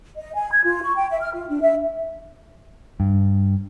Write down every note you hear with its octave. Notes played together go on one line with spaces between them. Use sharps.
D#5
G#5
G#6
F4
C#6
G5
E5
F6
F4
D4
E5
G2